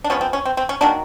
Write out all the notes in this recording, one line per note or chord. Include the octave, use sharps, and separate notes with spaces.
D4
F3 G#3 B3 C#4
C4
C#4
C4
C4
C#4
D#3 F#3 A#3 D4